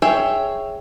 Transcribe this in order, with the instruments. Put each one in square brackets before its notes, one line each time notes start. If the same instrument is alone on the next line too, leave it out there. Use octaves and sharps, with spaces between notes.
[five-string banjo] G#4 C#5 E5 G5